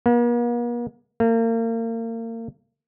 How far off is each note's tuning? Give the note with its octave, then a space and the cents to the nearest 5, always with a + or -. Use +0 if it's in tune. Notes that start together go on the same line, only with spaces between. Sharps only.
A#3 +45
A#3 -35